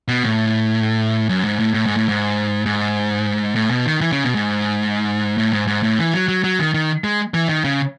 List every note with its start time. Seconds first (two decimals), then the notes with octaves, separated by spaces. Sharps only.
0.08 B2
0.23 A2
1.29 F#2
1.45 G#2
1.59 A2
1.74 A2
1.86 G#2
1.97 A2
2.09 G#2
2.66 G#2
3.55 A2
3.71 B2
3.86 D#3
4.01 E3
4.12 C#3
4.24 B2
4.35 G#2
5.38 A2
5.53 G#2
5.67 G#2
5.83 A2
5.99 E3
6.14 F#3
6.28 F#3
6.44 F#3
6.59 D#3
6.74 D#3
7.04 G#3
7.34 E3
7.49 D#3
7.64 C#3